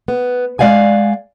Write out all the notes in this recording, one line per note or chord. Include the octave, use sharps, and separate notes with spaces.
B3
G#3 D5 F5 F#5 G#5